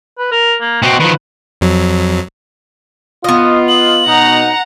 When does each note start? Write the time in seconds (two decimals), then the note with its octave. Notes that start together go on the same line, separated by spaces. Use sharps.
0.18 B4
0.31 A#4
0.61 A#3
0.82 B2 C4 F#4
1.00 D#3 F3 B4
1.61 F2 F#3
3.24 B3 F4 D#5
3.68 F#7
4.06 B2 D#4 F#5 A#5